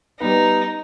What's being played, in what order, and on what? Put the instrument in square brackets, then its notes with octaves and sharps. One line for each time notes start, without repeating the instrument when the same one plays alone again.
[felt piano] G3 B3 B4 [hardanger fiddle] D#4